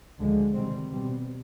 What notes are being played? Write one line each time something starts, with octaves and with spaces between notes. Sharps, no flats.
D2 D3 F3 G#3
C3 D#3 G3 C4
B2 G3 C4